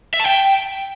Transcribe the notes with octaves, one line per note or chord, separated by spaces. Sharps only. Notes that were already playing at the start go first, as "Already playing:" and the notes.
E5
A5
G5